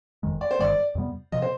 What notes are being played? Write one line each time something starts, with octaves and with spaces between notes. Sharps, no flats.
F1 F2 D#3 G#3
D5
C5
G1 G2 D#3 G#3 D5
F2 C3 G3 B3
C3 F3 D#5
C5